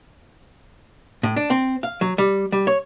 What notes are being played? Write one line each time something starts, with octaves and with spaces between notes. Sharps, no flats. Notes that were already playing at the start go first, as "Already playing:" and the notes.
A2
D4
C4
F5
F#3
G3
G3
C#5